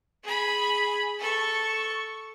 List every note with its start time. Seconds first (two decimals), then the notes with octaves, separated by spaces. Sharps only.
0.24 G#4 B5
1.19 A4 C#6